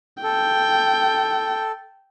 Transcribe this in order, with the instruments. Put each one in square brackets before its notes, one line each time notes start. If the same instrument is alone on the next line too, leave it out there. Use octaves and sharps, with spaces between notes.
[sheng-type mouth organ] A4 [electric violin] G5